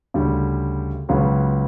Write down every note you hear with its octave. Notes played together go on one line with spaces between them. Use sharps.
D2 C#3 G3
C#2 C#3 F#3 B3